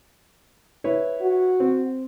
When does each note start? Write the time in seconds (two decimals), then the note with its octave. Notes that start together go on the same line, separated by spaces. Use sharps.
0.84 E4 B4 C#5
1.21 F#4
1.60 C4